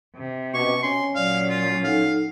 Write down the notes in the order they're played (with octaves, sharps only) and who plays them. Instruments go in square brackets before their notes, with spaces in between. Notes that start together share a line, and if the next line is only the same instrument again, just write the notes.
[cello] C3
[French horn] B2 [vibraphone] C#4 D#5 D6 [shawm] C#6
[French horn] C#4 [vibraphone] G#5 [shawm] C6
[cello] A#2 F#3 [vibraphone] D5 [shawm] F5
[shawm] F4
[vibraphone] D#4 A4 F#5 [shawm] F5